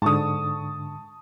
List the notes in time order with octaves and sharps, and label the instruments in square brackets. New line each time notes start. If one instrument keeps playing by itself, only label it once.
[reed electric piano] G#2 D3 [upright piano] A5 C#6 D#6